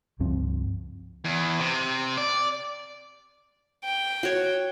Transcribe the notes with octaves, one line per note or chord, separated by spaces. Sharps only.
C#2 G2 F3 C4
E2
C3
D5
G5
F#4 C#5